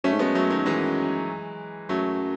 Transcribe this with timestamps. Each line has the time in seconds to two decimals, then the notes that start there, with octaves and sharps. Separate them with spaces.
0.04 F#2 A3 C#4
0.12 G#2
0.19 F#2 G#3 B3
0.35 F#3 A3
0.50 D#3 F#3
0.66 E3 G#3
1.89 F#2 F#3 A3